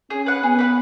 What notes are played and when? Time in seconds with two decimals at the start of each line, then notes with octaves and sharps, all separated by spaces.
0.10 C#4 G#4
0.26 B4 F#5
0.43 B3 G#4
0.59 B4 F#5